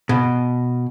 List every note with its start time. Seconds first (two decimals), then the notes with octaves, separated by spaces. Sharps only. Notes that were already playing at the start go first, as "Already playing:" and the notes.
0.09 B2